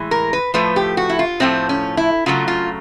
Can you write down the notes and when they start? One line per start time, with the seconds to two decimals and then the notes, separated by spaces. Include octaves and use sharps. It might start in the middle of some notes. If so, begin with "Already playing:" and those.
Already playing: A2 E3 G#3
0.11 A#4
0.33 B4
0.54 A2 F3 A3 B4
0.76 G4
0.97 F#4
1.09 E4
1.19 F4
1.40 A2 F3 A3 C4
1.69 C#4
1.97 E4
2.26 C#3 F#3 A3 F4
2.48 F4